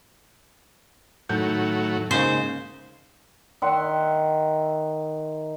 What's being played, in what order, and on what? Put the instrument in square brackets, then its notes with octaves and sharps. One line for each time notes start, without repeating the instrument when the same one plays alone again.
[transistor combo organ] A2 F#3 [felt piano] D#3 G6
[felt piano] G#2 A#3 D#4 [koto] C#3 C5
[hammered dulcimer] D#3 E5 F#5 C6